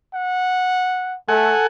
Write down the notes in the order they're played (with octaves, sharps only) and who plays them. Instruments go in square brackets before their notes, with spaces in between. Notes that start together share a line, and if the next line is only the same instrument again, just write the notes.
[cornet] F#5
[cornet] A3 [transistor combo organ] A4 F#5 G#5